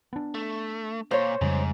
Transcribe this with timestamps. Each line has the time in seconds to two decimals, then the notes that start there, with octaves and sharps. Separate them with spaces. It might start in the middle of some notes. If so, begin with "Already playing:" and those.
0.13 B3 D4
0.35 A3
1.11 A#2 C5 C#5
1.41 F2 G#2 C#3 G3